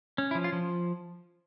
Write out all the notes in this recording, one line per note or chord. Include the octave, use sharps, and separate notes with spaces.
C#4
E4
F3
F4
F3